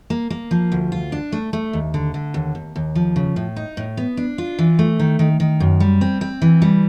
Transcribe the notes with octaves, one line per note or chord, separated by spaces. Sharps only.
A#3
A#3
F3
D2
F4
D4
A3
A3
D#2
D3
D3
D#2
D#2
D#2
F3
C#3
A2
D#4
A2
B3
D4
F4
E3
A3
D#3
D#3
D#3
F#2
G3
C4
C4
E3
G3